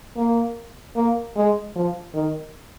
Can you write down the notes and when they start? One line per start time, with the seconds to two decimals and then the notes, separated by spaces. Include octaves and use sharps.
0.17 A#3
0.96 A#3
1.36 G#3
1.76 F3
2.14 D#3